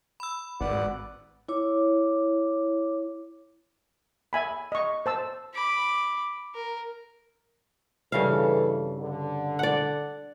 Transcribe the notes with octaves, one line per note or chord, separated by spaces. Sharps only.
B5 E6
G#1 B4 D5 F#5
E4 C#5 D6
E5 G#5 B5
D#5 C#6
C5 A5 E6
B5 D6
A#4
G2 C#3 E3 A4 F5
D3
D5 F#5